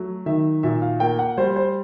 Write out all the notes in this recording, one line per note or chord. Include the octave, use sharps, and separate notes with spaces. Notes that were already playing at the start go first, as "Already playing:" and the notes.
Already playing: F#3 A3
D#3 E5
A#2 E5
F5
A#3 G5
F#5
G3 C5
C5